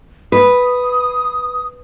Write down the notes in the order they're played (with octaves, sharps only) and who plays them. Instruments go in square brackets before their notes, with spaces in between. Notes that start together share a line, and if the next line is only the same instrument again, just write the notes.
[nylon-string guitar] B4 [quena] D#6